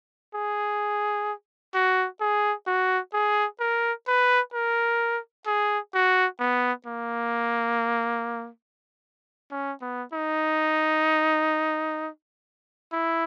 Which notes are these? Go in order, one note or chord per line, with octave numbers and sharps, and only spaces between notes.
G#4
F#4
G#4
F#4
G#4
A#4
B4
A#4
G#4
F#4
B3
A#3
C#4
B3
D#4
E4